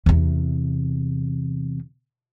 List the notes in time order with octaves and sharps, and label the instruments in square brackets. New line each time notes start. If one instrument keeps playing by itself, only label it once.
[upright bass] E2 C3